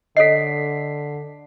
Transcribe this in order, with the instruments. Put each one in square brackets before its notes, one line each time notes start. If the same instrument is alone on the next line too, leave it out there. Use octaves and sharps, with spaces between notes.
[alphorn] D3 [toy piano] A4 C#5 D#5 [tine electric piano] B6 C7